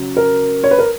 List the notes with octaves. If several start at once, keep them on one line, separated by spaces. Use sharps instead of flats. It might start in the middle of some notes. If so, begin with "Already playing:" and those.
Already playing: C#3 F#3
A#4
C#5
B4
A#4